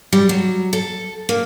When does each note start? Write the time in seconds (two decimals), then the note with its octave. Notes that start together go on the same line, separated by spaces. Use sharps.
0.13 G3
0.29 F#3
0.73 A4
1.29 A#3